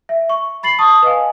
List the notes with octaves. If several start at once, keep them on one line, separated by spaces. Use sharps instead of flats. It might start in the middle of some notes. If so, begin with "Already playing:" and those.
E5
C#6
B5 A6 C7 F#7
A5 C#6 D#6
B4 D#5 F5 G#5